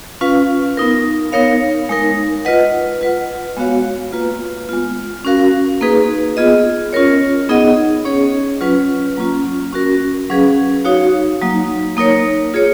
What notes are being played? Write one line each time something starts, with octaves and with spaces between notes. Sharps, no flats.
C#4 F4 B4 F5
B3 D#4 A#4
B3 D#4 A#4 C#5 F5
G#3 D#4 A#4
F4 B4 D#5 F#5
F4 B4 F#5
G#3 B3 F#4 C#5 F5
A#3 F4 B4
G#3 B3 F4
C#4 F#4 A#4 F5
A#3 D#4 G#4 B4
B3 F4 G#4 D#5
C#4 F4 A#4 C#5
B3 D#4 G#4 D#5 F#5
C#4 G#4 C#5
F#3 C#4 F4 B4
F#3 A#3 C#4 F4
C#4 F#4 A#4
F#3 C#4 G#4 B4 F5
D#4 F#4 C#5 F5
F#3 A#3 D#4
A#3 D#4 A#4 C#5
F4 G#4 C#5